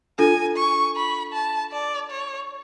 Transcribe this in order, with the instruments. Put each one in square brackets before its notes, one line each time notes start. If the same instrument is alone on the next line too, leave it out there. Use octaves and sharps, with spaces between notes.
[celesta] D4 F4 A4 [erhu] G#5
[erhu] C#6
B5
A5
D5
C#5